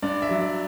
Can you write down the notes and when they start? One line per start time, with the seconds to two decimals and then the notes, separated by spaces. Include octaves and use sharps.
0.02 G2 D5
0.22 E5
0.29 F#3
0.41 D5